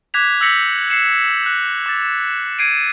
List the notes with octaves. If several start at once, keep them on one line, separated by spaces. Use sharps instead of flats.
D6 F#6 G#6 B6 F7
E6 G6 A#6 B6 C#7 F#7
C7 C#7 E7
F#6
D6 A6
G#6 C7 D7 D#7